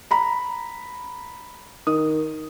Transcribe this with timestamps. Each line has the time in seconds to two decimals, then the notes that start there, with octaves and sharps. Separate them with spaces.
0.11 A#5 B5
1.87 D#3 D#6